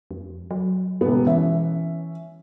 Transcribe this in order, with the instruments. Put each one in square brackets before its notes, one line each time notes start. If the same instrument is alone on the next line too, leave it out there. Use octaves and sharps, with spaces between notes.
[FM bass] F2
F#3
[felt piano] E1 B3 [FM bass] G2
[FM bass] E3 [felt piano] C#4 E5